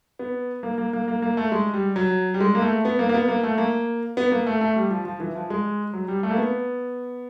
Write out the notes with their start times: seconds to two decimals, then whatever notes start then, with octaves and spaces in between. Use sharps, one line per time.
0.19 B3
0.63 A#3
0.78 A#3
0.93 A#3
1.08 A#3
1.22 A#3
1.37 A3
1.52 G#3
1.74 G3
1.96 F#3
2.34 G3
2.40 G#3
2.55 A#3
2.62 A3
2.85 B3
2.99 A#3
3.09 A#3
3.14 B3
3.28 A#3
3.43 A3
3.58 A#3
4.17 B3
4.32 A#3
4.47 A3
4.61 A3
4.76 G3
4.90 F3
5.05 F3
5.20 E3
5.35 F3
5.50 G#3
5.94 F#3
6.08 G3
6.23 A3
6.30 A#3
6.38 B3